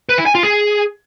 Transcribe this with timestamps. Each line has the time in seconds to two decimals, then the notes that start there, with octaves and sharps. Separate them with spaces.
0.09 B4
0.18 E4
0.26 G#5
0.35 F4
0.43 G#4